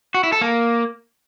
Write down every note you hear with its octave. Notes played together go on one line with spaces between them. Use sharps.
F#4
E4
A4
A#3